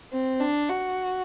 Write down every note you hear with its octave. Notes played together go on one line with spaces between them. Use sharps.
C4
D4
F#4